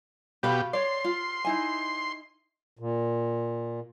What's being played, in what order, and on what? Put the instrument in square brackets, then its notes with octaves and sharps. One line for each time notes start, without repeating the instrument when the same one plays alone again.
[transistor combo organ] B2 G4 [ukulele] F#4 F5 B5
[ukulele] C#5 D5 [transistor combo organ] C6
[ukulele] F4
D#4 E4 G#5
[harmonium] A#2